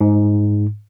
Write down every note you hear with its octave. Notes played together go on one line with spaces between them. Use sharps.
G#2